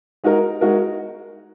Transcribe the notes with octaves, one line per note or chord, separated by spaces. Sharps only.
G#3 D#4 F#4 A#4
G#3 D#4 F#4 A#4